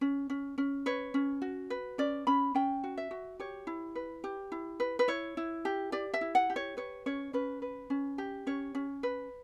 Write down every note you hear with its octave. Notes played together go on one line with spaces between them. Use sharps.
C#4
C#4
C#4
B4 C#5
C#4
F#4
B4
C#4 D5
C#4 B5
C#4 G5
F#4
E5
F#4
G4 C#5
E4
B4
G4
E4
B4
B4
E4 C#5
E4
G4
G4 D5
E5
E4
F#5
G4
C#5
B4 C#5
C#4 C#5
C#4 B4
B4
C#4
G4
C#4 C#5
C#4
B4